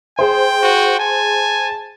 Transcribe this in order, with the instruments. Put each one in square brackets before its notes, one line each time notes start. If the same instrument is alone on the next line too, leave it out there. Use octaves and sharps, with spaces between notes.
[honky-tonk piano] G#4 C5 [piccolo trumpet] G5
[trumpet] F#4
[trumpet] G#5 [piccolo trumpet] A5